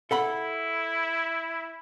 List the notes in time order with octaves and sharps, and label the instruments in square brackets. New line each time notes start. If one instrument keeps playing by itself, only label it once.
[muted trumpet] E4 [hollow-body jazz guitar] A4 F#5 B5